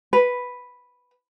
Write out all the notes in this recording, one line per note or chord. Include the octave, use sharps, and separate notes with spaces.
B4